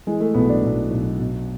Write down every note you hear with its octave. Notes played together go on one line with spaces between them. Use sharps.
E3 G#3
A3
B1 B3
D4
B1
B1
B2